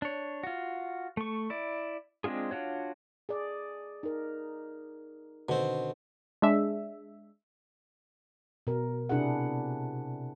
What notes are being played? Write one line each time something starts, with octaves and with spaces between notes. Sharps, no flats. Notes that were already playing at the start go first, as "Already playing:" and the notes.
D4 C#5
F4 F#4
A3 C#6
E4 D5
G#3 C4 D4 F4 G#4
D4 F4 F#4 C#5
G#4 D5
D#4 A#4
B2 D3 D#3 C4
G#3 D4 E5
B2 A#4
C3 D4 E4 G#4 F#5